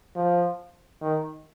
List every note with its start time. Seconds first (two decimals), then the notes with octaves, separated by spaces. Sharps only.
0.16 F3
1.01 D#3